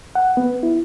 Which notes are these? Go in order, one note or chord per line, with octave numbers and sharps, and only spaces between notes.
F#5
B3
E4